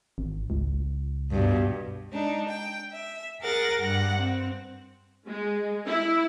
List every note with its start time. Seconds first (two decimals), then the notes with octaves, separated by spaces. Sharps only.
0.18 G#1
0.50 C#2
1.32 G2 B2
2.10 G#3 D4 D#4
2.48 G5
2.92 E5
3.41 G#4 A#4 F#5 A6 A#6
3.80 G2 F#5 A#6
4.17 C4
5.27 G#3
5.87 E4